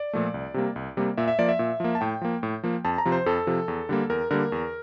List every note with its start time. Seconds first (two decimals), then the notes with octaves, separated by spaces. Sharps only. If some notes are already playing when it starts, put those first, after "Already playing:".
Already playing: D5
0.13 A#2 F3 A3
0.34 C2
0.54 C3 G3 A#3
0.76 C2
0.97 C3 G3 A#3
1.17 A#2 E5
1.28 E5
1.39 F3 A#3 D5
1.49 E5
1.59 A#2
1.80 F3 A#3
1.95 A5
2.01 A2 G5
2.21 F3 A#3
2.43 A2
2.63 F3 A#3
2.85 F2 A5
2.98 A#5
3.06 C3 F3
3.12 C5
3.26 F2 A4
3.47 C3 F3
3.68 E2
3.89 D3 G3 A#3
4.10 E2 A#4
4.31 D3 G3 A#3 A#4
4.52 E2